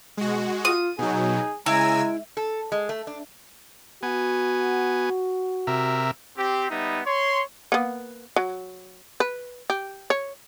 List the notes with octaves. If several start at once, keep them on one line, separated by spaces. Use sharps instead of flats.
B2 G#3 F#4
F4 D#6
B2 F#3 D#4 G#4
C#3 G#3 E4 G#5 A#5 E6
A4
G#3
A3
D4
B3 F#4 G#5
C3 A#4 E5
C4 G4
G3 B3 D#4 E5
C#5 C6
A#3 B3
F#3
B4
G4
C#5